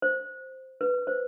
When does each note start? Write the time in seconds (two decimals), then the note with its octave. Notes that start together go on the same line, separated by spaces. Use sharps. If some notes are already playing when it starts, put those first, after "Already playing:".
0.02 C5
0.81 B4
1.07 C5